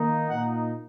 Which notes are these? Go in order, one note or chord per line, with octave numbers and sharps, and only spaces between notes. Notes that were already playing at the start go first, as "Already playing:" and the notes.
Already playing: D#3 A#3 D#4
A#2 A#3 D#4 F#5